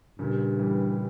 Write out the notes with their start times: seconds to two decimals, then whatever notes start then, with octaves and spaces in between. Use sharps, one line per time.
0.19 G2 A#2 C#3
0.59 E3 G3